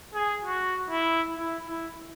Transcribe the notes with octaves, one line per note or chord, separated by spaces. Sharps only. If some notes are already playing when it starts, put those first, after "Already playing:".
G#4
F#4
E4
E4
E4